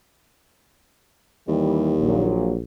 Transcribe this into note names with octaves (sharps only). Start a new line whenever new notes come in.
D#2 E3 G3
A#1 A#2 F#3